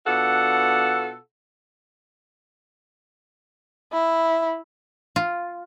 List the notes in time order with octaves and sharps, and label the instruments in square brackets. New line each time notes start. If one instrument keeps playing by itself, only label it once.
[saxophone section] B2 D4 F4 A4 F#5
[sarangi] E4
[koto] F4